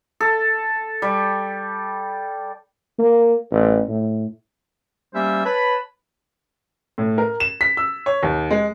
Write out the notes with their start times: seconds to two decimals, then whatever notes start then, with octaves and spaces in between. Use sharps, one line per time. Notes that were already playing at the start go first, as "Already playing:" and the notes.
0.20 A4
1.02 G3
2.99 A#3
3.51 A1
3.89 A2
5.14 G3 A#3 C#4 G4 C5 E5
5.44 B4 C#5 A5 B5
6.98 A2
7.18 A#4
7.40 E7
7.61 B6
7.77 E6
8.06 C#5
8.23 D#2
8.51 G#3